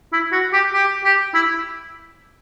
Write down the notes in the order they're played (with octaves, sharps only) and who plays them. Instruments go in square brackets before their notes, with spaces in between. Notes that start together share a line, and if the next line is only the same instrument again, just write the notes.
[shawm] E4
F#4
G4
G4
G4
E4